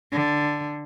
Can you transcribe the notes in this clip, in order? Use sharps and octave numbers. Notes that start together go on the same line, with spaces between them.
D3